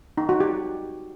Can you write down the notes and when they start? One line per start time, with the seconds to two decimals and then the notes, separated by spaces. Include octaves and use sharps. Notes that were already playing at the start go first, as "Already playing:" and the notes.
0.18 D#4
0.29 F#4
0.40 G4